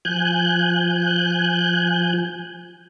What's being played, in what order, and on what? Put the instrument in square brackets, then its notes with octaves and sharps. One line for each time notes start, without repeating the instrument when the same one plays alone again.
[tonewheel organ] F3 G#5 F#6 G6